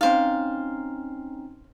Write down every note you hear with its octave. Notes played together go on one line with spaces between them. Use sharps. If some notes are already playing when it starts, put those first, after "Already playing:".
C4 C#4 D#4 C5 F5